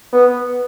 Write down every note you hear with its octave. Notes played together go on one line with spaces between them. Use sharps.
B3